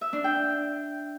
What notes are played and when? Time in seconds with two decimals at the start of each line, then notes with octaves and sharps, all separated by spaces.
0.01 E5
0.13 D4
0.24 G5